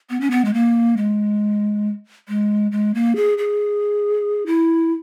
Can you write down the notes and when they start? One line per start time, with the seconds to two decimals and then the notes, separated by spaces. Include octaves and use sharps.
0.10 B3
0.21 C#4
0.31 B3
0.45 G#3
0.54 A#3
0.97 G#3
2.28 G#3
2.72 G#3
2.94 A#3
3.16 G#4
3.38 G#4
4.46 E4